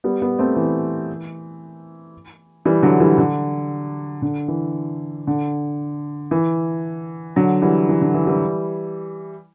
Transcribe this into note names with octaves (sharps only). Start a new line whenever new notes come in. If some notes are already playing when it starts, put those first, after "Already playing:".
G3 B3
G3 B3
A3 C4
E3
E3 G3
D3 F#3
E3 G3
D3
D3
E3
D3
E3
D3 F#3
E3 G3
E3
D3
E3
E3 G3